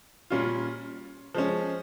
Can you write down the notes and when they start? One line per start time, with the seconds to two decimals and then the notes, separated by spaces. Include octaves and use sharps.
0.30 A#2 G3 C#4 F4
1.35 F3 G#3 C#4